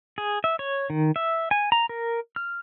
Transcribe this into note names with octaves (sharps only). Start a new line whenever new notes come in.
G#4
E5
C#5
D#3
E5
G#5
A#5
A#4
F6